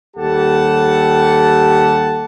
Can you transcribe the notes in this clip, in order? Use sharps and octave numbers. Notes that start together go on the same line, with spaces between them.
D#2 G3 G4 A4 F#5 A5